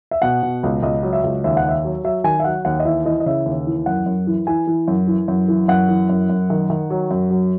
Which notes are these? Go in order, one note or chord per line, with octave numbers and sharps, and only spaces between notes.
E5
B2 F#5
B2
C#2
C#2 D#5
F#3
E5
C#2
D#2 E5
F#5
D#2
E5
F#3
F#3 E5
D#3 G#5
E5
F#3 F#5
D#2 F#5
D#5
E3 E5
E3 D#5
D#5
C#3 E5
D#2
E3
F#2 F#5
F#2
E3
E3 G#5
E3
F#2
E3
F#2
E3
F#2 F#5
E3
F#2
F#2
D#3
D#3
F#3
F#2
F#3